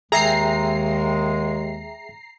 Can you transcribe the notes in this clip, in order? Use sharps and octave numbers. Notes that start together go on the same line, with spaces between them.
D#2 D#3 G#3 G#4 E5 G5 A#5 C7